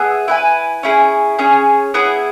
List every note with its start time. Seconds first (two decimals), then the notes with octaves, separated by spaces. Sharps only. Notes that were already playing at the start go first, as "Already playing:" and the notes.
Already playing: B3 G#4 E5 G#5
0.28 E4 B4 G#5
0.83 C#4 E4 G#4
1.39 C#4 G#4 C#5
1.94 B3 E4 G#4